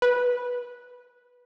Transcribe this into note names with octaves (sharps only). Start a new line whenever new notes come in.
B4